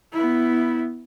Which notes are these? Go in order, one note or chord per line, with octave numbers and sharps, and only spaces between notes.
B3 E4